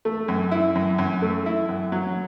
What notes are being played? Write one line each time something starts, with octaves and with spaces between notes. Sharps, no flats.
A3
F#2
E4
F#2
F#2
A3
E4
F#2
F#3